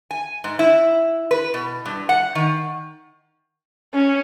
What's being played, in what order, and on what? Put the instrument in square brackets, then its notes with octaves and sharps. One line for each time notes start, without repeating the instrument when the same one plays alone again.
[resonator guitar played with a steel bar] G#5
G#2
E4
B4
B2
G2
F#5
D#3
[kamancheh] C#4